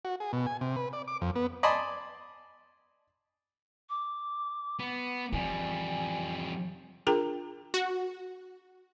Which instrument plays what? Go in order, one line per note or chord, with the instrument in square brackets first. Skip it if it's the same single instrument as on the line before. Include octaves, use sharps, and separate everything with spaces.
[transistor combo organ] F#4
G#4
B2
G#5
C3
B4
D5
D6
F2
B3
[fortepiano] D5 D#5 G#5 A5 B5 C6
[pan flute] D6
[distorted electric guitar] B3
[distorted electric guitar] F2 G3 [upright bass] E3 [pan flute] G#5
[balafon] D4 F4 G#4 A#4 G5 A#5
[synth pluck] F#4